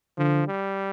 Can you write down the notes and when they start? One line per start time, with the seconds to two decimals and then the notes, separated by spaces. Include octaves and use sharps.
0.18 D3 F3
0.47 G3